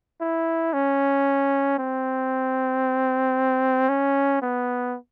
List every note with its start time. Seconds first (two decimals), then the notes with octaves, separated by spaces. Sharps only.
0.21 E4
0.73 C#4
1.79 C4
3.89 C#4
4.42 B3